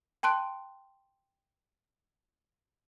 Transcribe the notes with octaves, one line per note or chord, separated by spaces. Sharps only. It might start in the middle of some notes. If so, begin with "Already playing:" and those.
G5 A5 C6 F#6 D7